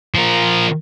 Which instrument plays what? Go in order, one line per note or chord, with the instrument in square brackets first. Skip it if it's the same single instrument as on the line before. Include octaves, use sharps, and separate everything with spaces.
[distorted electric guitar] F3 A#4